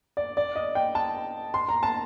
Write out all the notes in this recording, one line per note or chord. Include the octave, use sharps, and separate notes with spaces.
D5
D5
D#5
G5
A5
C6
A#5
A5